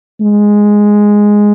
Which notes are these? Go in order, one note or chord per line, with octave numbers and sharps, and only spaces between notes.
G#3